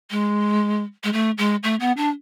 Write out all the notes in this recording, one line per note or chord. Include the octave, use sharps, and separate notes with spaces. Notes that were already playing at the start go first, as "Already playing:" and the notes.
G#3
G#3
A3
G#3
A3
B3
D4